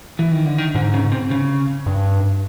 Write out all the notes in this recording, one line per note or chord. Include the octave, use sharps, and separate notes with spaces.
E3
D#3
D3
D#3
G#2 D3
C#3
C3
C#3
G2